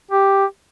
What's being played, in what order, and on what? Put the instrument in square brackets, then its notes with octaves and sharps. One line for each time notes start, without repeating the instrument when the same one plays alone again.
[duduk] G4